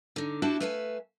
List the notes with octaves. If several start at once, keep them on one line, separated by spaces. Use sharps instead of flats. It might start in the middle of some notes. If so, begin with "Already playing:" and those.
D3 D#4
D4 E4 F#4 G4 A5
A3 B4 E5 F5 G5 G#5